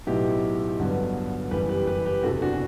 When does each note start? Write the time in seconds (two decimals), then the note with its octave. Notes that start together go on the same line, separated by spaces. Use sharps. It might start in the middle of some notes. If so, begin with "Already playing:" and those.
0.07 B1 A2 F#3 B3 E4 G4
0.79 G1 G2 D3 F#3 B3
1.51 F#1 F#2 E3 G3 G4 B4
1.69 G4 B4
1.87 G4 B4
2.05 G4 B4
2.23 F#1 E2 C3 E3 F#4 A4
2.42 D4 F#4